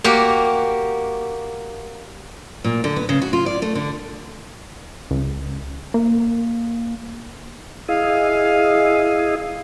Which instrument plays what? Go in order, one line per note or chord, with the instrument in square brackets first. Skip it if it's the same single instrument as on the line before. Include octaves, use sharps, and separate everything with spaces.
[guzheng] A#3 F#4 G4
[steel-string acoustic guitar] A#2
D3
B3
C#3
F#4
F4
D5
A3
D3
[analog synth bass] C#2
A#3
[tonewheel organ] E4 G#4 D#5 [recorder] F5